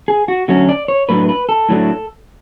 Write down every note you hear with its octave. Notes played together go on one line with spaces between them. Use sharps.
G#4
F#4
D3 F#3 A3 C#4 F#4
D5
C#5
A2 F#3 A3 D4 B4
B4
A4
A2 F#3 A3 D4